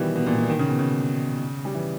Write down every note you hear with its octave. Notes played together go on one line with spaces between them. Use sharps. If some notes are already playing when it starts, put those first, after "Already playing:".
Already playing: B2 D#3 E3 G3
B2
A#2
B2
D#3
C#3
B2
C#3
G3
E3